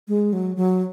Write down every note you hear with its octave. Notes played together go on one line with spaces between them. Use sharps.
G#3
F#3
F#3